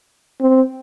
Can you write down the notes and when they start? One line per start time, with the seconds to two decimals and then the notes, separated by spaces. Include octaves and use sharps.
0.41 C4